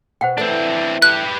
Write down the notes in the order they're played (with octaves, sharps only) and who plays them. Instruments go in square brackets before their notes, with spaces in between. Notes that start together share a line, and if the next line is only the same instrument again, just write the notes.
[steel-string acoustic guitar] B2 [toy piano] C5 F#5 G5
[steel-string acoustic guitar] E3 A3 [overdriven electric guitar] C4 D4
[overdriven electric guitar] G4 B4 [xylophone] F#6